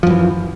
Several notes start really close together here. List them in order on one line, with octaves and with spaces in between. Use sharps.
F3 F#2 E3